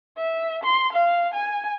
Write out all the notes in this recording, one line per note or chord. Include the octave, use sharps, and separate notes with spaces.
E5
C6
F5
G#5